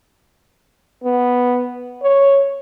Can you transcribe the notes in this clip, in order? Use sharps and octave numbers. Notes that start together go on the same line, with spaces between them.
B3
C#5